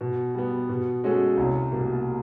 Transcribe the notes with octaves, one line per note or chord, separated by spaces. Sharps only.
B2
G3 B3
B2
G#3 C#4 F#4 A4
C2
B2 G3 A#3